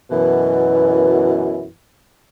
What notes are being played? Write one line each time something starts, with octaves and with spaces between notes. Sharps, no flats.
F#2 B2 E3